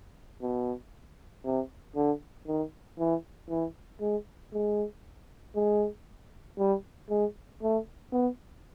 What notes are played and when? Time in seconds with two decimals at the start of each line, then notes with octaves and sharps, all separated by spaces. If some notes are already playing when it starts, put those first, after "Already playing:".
0.42 B2
1.44 C3
1.96 D3
2.47 D#3
2.99 E3
3.49 E3
4.01 G#3
4.53 G#3
5.55 G#3
6.58 G3
7.09 G#3
7.62 A3
8.12 B3